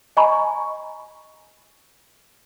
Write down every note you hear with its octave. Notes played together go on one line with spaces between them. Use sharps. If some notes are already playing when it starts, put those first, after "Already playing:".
D#5 G#5 A#5 B5 C#6